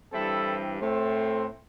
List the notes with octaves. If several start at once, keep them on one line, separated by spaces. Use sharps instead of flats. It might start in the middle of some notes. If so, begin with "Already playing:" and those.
G2 E3 G3 C4 E4 A4
A2 A3 C4